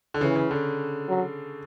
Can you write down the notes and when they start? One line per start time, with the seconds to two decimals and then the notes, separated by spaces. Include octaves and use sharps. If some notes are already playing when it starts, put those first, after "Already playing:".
0.14 D3
0.21 C#3 E3
0.36 C#3
0.51 D3
1.09 F#3